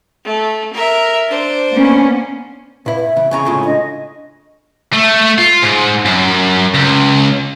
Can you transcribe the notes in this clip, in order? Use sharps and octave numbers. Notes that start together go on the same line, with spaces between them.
A3
A#4 E5
D4 C5
A#3 B3 C#4
A#2 E4 B4
E5
C#3 E3
E2 C#3 G#4 G#5 A#5 C#6
C#2 A2 C#3 F4
D4 D#5
A3
F4
G#2
F#2
C#2